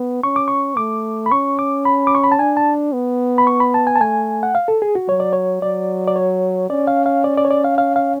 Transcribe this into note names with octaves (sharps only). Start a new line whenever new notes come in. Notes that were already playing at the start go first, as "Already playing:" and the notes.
Already playing: B3
C#4 C#6
D6
C#6
A3 D6
B5
C#4 C#6
D6
B5
D6
C#6
B5
A5
D4 G#5
A5
B3
B5
C#6
B5
A5
G#5
A5
A3 G#5
F#5
F5
A4
G#4
F#4
F#3 C#5
D5
C#5
F#3 D5
D5
C#5
C#4 D5
F5
F5
D5
D5
C#5
D5
F5
F5
F5